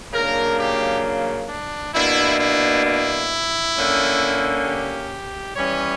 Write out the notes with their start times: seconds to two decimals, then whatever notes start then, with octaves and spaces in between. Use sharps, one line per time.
0.13 C#3 F#3 A#3 D4 A#4
0.59 G4
1.49 D4
1.95 B2 A#3 D4 E4
2.40 E4
2.86 E4
3.75 D3 A#3 C#4
4.65 G4
5.56 E3 G3 C#4 C#5